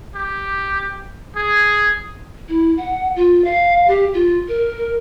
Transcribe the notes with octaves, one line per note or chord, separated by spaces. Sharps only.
G4
G#4
E4
F#5
F4
F5
G4
F4
A#4